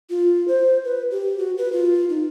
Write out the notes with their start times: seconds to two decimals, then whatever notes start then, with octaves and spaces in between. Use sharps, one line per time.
0.10 F4
0.48 C5
0.85 B4
1.11 G4
1.38 F#4
1.58 B4
1.72 F4
2.09 D#4